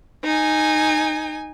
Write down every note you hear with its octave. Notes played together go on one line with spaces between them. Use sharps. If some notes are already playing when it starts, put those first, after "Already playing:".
D#4 G#5